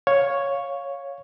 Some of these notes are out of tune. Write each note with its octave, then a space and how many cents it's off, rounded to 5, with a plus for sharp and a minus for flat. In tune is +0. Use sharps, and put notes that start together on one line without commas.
C#5 +0 F5 +10